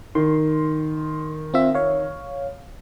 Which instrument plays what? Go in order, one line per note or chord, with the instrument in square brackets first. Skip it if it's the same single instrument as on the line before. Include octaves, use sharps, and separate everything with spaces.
[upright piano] D#3 [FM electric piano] C6
[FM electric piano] C4 F4 E5
C#5 F5